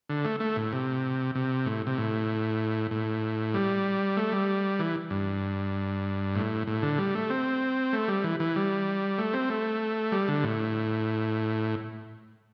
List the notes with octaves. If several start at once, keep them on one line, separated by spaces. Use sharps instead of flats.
D3
A3
A3
A2
C3
C3
A2
C3
A2
A2
G3
A3
G3
E3
G2
A2
A2
D3
G3
A3
C4
A3
G3
E3
E3
G3
A3
C4
A3
G3
D3
A2